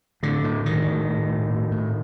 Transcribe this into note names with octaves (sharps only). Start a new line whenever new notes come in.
A2 D3
A2
A2 D#3
A2
A2
A2
A2
A2